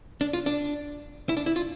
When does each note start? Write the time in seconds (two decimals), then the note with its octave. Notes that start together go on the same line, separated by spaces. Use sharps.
0.21 D4
0.33 F4
0.46 D4
1.29 E4
1.37 D4
1.46 E4
1.56 F4